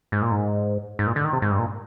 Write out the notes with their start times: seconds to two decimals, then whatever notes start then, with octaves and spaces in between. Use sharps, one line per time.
0.12 G#2
0.22 A#2
0.31 G#2
0.99 G#2
1.07 A#2
1.16 D3
1.25 D#3
1.33 C3
1.42 G#2
1.51 G2
1.59 A#2